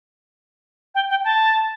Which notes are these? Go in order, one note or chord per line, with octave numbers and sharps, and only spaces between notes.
G5
G5
A5